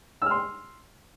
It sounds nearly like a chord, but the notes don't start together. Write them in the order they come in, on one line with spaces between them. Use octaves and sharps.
E6 F6 C6